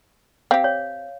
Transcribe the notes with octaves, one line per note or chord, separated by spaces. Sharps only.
C4 G4 F5
C#5